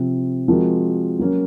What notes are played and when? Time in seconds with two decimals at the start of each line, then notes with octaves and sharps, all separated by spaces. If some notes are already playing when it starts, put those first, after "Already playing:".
Already playing: C3 F3 C4
0.48 F3 G#3 C4 F#4 A#4
1.19 F#3 A#3 C#4 F#4